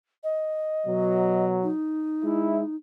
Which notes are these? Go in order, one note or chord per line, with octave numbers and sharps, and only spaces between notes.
D#5
B2 F#3
D#4
G#3 E4